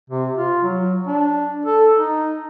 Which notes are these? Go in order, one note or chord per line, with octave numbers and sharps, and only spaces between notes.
C3
F4
F#3
D4
A4
D#4